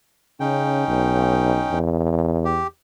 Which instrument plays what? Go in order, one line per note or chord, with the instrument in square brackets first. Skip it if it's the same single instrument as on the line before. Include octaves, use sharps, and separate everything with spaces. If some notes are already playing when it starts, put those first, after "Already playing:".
[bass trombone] C#3 [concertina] C#4 D#4 G5
[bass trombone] B1
E2
[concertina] G4